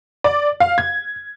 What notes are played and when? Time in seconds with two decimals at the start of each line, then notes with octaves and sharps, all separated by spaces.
0.24 D5
0.60 F5
0.78 G#6